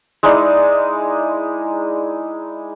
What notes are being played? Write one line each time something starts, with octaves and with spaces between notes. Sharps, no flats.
G#3 D#4 E4 D5